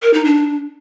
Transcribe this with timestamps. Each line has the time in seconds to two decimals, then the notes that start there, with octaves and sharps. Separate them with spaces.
0.02 A#4
0.14 D#4
0.25 D4